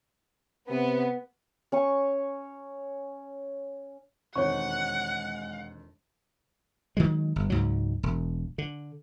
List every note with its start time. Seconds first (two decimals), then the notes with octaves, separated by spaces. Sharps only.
0.70 C3 B3
1.72 C#4 G#5 C#6
4.36 E1 F2 D#3 G#3 C#5 F#5 C#6
6.97 D#3 F#3 G#3
7.36 G1
7.50 C#2 G#2 F#3
8.03 E1
8.58 D3